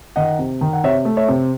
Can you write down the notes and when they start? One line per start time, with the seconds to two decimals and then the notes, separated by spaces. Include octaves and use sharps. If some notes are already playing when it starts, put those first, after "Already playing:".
0.16 D#3 D#5 F#5
0.39 C3
0.61 D#3
0.73 F#5
0.84 C3 C#5 E5
1.05 A3
1.17 C#5 E5
1.28 C3